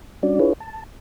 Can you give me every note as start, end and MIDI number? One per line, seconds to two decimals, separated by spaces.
0.23 0.39 55
0.23 0.39 61
0.23 0.39 62
0.23 0.39 66
0.23 0.39 74
0.40 0.53 62
0.40 0.53 64
0.40 0.53 65
0.40 0.53 68
0.40 0.53 71
0.40 0.53 73
0.60 0.84 81